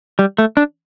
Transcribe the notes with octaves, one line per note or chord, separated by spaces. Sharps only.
G3
A3
D4